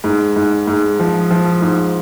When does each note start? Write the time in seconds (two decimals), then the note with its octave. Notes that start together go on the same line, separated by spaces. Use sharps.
0.04 G#2
0.36 G#2
0.67 G#2
0.99 F3
1.31 F3
1.62 G#2